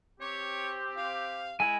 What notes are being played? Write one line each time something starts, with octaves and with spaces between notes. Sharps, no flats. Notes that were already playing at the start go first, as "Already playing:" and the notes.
C4 G4 C#5
F5
G#3 E4 G#5